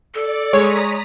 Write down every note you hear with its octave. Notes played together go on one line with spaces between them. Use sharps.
A4 D5
G#3 C#5 A#5 D#6 B6